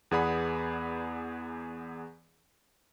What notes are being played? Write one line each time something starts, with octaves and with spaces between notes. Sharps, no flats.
E2 B3 G#4 D5 F#5 B5